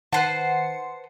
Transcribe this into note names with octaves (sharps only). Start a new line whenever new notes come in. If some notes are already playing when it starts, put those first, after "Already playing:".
D#3 B4 C5 F#5 A5 C#7